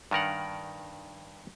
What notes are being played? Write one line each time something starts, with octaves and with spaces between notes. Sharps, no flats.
G2 D#3 A#4 F#5